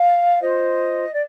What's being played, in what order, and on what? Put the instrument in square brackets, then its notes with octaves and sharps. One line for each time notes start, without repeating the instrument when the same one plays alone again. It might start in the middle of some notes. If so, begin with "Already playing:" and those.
Already playing: [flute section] F5
F4 C5 D#5
D5